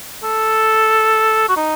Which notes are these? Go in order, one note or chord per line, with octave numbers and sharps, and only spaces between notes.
A4
F#4
D#4